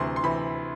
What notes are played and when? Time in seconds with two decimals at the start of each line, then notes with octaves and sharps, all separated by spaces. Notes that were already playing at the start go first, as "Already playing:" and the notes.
Already playing: D2 C3 E3 C6
0.16 C6
0.23 C3 E3 B5